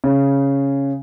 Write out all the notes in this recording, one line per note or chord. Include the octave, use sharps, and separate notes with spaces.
C#3